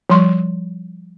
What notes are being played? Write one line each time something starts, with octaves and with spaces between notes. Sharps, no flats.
F3 G3 C6 C#6